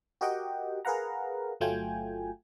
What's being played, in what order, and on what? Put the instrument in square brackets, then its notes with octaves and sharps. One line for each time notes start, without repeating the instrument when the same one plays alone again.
[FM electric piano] F#4 G4 A#4 D#5 F#5 G5
G#4 A#4 B4 F5 F#5 A#5
G1 F#3 A3 F4 G5 G#5